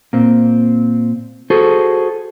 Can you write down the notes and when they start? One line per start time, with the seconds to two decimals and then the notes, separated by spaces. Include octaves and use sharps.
0.13 A#2 C4
1.50 F#4 G#4 A4 C5